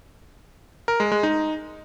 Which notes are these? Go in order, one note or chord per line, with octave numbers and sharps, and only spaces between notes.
A#4
G#3
G#3
D#4